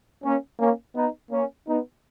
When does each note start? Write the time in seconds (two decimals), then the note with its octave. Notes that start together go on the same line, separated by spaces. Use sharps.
0.23 A#3 C#4
0.59 A#3 C#4
0.95 B3 D#4
1.31 A#3 C#4
1.67 B3 D#4